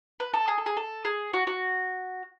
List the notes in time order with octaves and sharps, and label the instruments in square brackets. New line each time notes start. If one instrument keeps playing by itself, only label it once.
[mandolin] B4
A4
G#4
A4
G#4
A4
G#4
F#4
F#4